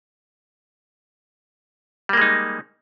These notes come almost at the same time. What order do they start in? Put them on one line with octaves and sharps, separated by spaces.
G3 A#3 G#3 D#4